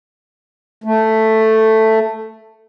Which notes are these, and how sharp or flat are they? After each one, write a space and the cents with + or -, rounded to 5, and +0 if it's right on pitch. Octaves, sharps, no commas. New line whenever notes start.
A3 +5